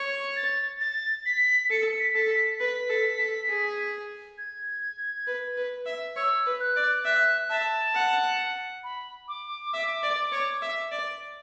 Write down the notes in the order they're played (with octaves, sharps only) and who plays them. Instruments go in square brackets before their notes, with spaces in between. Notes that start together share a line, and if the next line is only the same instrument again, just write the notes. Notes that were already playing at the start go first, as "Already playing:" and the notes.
Already playing: [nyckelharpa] C#5
[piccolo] A6
A6
B6
[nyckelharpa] A4 [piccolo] C#7
[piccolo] B6
[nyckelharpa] A4
[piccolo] B6
[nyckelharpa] B4 [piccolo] B6
[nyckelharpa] A4
A4
G#4
[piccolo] G#6
[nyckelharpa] B4
B4
E5
[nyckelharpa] C#5 [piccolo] E6
[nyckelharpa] B4
[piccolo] F#6
[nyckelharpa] D5
[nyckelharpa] E5 [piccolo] F#6
[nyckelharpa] E5 [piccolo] A5
[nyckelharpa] F#5
[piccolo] B5
D6
[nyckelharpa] E5
D5
C#5
E5
D5